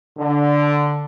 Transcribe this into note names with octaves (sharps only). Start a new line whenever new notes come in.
D3